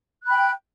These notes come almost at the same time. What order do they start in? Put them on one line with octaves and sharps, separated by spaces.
F#6 B5 G5